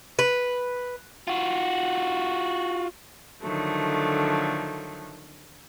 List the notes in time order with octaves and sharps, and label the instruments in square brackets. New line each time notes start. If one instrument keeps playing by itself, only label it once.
[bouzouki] B4
[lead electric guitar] F4 F#4
[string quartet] D3 D#3 F3 F#3 A3